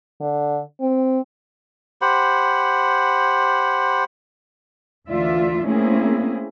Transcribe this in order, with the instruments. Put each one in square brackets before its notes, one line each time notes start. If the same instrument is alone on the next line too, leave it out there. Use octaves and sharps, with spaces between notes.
[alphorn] D3
C4
[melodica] G4 C5 F#5 B5
[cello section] D2 E3 F4 D5 E5
A3 A#3 C4 C#4 E4 G#4